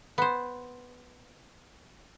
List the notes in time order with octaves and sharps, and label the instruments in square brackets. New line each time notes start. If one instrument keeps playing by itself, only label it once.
[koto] B3 C5